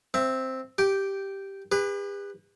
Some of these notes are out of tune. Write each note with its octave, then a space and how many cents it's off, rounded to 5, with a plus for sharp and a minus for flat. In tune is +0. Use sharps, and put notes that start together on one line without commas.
C4 +0 E5 +20
G4 -5 G5 -10
G4 +45 B4 +0